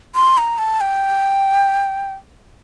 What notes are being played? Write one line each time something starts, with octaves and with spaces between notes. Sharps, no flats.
C6
A#5
A5
G5